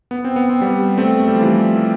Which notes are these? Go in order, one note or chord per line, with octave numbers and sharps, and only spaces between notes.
B3
C4
B3
C4
G3 B3
A3 C4
A3
G3
F3
E3